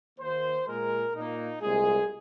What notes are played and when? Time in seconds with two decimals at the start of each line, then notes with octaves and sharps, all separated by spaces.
0.18 D#2 D#3 A#3 C5
0.66 A#2 G#3 A#4
1.14 A#2 A#3 D#4
1.61 C2 A#2 G#3 G#4